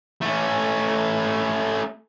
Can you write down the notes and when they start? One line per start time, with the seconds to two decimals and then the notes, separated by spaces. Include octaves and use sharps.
0.21 A3 C#4